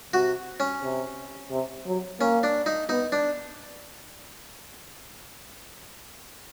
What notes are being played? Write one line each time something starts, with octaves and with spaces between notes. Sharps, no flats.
C3 F#4
C#4
C3
C3
F#3
A#3 C#4
D4
D#4
B3 D#4
D4